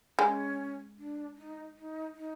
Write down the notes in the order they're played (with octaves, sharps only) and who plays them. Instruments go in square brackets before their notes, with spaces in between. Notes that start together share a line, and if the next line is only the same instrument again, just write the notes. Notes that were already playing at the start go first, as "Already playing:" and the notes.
[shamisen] G#3 [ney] C#4
[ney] D4
D#4
D#4
D#4